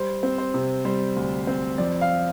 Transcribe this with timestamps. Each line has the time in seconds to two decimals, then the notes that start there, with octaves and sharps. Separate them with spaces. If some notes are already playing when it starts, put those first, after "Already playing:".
Already playing: G3 C5
0.23 C4
0.38 C5
0.54 C3
0.85 G3 C5
1.16 D2
1.47 C4
1.78 F2 D5
2.01 F5